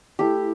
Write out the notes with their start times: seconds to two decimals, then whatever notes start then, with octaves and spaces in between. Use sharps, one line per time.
0.19 A3 E4 G4